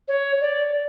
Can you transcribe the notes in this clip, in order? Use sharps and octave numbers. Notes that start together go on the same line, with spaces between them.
C#5
D5